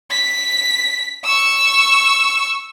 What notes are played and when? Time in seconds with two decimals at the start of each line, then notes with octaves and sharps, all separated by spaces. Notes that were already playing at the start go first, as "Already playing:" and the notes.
0.11 B6
1.24 C#6 E6